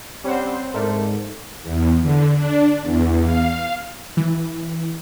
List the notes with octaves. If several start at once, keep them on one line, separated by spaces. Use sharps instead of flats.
G3 C4 C#4 C5 F#5
G#2 A3 A4 A#4 D5
E2
D3
D4
E2
F5
E3